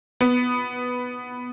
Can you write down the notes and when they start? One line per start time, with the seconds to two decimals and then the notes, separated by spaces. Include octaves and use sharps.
0.21 B3